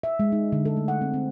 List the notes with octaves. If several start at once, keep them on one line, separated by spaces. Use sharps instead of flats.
E5
G#3
D#4
D3
A4
A3
F#5
C4
C4